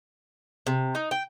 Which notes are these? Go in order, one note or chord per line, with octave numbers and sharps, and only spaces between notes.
C3
D#4
G5